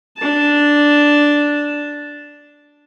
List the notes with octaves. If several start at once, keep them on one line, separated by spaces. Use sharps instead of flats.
D4 A5